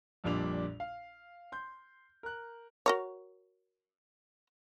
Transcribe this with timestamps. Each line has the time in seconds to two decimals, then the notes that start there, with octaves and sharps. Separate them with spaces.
0.24 A#1 F2 A#2 G3 D4 F7
0.80 F5
1.52 C6 G6
2.23 A#4 F#6
2.86 F#4 A#4 C#5